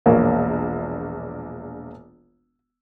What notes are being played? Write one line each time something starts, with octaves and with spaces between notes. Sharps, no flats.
E1 A#1 A#3 A#4 C#5